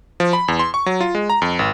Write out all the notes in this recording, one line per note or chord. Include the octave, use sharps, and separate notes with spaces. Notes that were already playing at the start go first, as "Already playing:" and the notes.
F3
B5
E2
C6
C#6
F#3
F4
G#3
A#5
F2
G#1